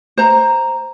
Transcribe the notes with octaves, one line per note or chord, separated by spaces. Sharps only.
C5 A#5